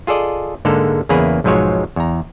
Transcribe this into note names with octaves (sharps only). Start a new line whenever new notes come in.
F4 G#4 A4 D5 D#5
G#2 D3 G#3 A#3 A4
E2 C#3 A#3 E4 G#4 B4
B1 G#2 F3 F#3 G#3 C#5
E2 A#5